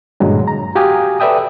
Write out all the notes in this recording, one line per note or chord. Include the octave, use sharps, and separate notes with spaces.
G2 A#2 D3 F#3 G#3
A#5
F#4 G4 F5 G#5 D#6
A4 B4 D5 E5 G5 D#6